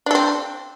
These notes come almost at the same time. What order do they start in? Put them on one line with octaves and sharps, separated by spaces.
D4 A4 C4